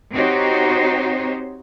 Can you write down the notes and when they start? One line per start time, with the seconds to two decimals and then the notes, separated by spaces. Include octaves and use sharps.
0.13 C4 D#4 F#4 G4 C5 C#5